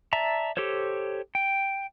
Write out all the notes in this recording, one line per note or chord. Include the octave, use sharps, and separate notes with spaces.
D5 E5 A5 A#5
G4 A4 C5 C#5
G5